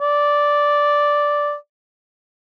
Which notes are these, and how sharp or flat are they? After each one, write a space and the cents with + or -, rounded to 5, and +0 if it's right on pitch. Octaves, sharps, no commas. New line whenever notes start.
D5 -5